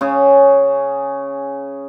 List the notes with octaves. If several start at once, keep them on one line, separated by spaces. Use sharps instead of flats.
C#3 C#4 G#4